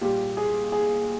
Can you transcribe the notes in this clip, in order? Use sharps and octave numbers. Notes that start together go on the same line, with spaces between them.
A#2 G3 G4
G#4
G#4